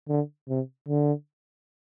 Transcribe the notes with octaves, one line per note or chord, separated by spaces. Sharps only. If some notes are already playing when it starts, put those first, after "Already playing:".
D3
C3
D3